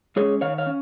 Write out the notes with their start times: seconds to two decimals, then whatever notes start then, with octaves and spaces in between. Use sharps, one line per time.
0.16 G#3 C#4 G#4 C#5
0.41 D#3 C#5 F5
0.58 C#5 F5
0.66 C#4